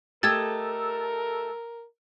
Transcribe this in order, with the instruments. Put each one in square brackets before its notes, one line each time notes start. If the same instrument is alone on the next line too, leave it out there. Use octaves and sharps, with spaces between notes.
[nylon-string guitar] A3 G4 D#5 [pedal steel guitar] A4 [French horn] A#4 [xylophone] E6 G#6 A6